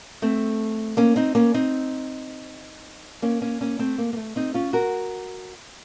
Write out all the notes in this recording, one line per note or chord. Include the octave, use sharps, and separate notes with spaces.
A3 C4
A#3 C#4
C4 D#4
A#3 C#4
C4 D#4
A#3 C#4
A#3 C#4
A#3 C#4
A3 C4
A#3
A#3
A3
C4 D#4
C#4 F4
F#4 A#4